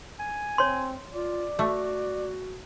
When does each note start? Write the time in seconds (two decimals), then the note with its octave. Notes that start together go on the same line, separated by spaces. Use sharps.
0.19 G#5
0.58 C4 C#5 C6
1.14 F4 D5
1.59 A3 F#4